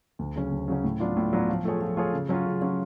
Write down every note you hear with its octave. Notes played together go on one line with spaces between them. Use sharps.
D2
C#3 F#3 C#4
D2
C#3 F#3 C#4
A2
F#3 B3 D4 F4
A2
F#3 B3 D4 F4
F3
A3 F4 G#4 C#5
F3
A3 F4 G#4 C#5
C#3
F#3 C#4 F4
C#3
F#3 C#4 F4